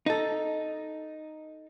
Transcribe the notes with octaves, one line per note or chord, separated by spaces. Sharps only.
D#4 A4